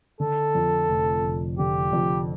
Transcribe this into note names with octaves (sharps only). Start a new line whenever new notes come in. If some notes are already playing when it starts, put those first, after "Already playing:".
D3 A4
F2
F1
F1
D3 G4
F2